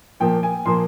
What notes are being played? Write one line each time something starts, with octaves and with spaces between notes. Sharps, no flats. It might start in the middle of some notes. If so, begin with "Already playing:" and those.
A#2 F3 A#3 G5
G#5
A#2 F3 A#3 C6